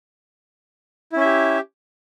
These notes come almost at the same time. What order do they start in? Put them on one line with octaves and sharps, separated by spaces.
E4 C#4 E5 G4